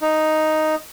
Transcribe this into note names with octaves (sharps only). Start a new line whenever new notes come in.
D#4